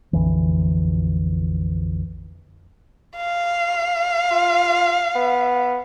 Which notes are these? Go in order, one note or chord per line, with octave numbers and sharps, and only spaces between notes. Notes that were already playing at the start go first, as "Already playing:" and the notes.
A#1 F2 D3 E3
F5
F4
B3